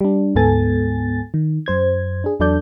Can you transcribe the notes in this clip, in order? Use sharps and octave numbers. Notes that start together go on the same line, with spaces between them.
G3 D4
D2 G#2 B3 A4 G#5 A6
D#3
F#2 C5 G#6
D4 G#4
E2 F#3 D4 A4 D5 G6